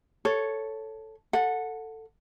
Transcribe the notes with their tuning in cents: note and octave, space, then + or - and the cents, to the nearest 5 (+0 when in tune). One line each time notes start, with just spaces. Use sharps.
A4 +0 C#5 +0
A4 +15 F#5 -20